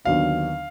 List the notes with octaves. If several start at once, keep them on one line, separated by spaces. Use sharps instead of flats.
D#2 D3 F#3 B3 D4 F5